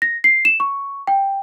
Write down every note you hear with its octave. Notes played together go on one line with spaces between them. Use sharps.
A#6
C7
E7
C#6
G5